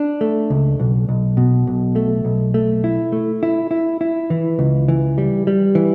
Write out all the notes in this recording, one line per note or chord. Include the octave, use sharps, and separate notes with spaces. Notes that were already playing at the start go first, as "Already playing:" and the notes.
Already playing: D4
A3
C#2
B1
B1
B2
B1
A3
B1
A3
E4
A3
E4
E4
E4
E3
C#2
E3
G3
G3
E3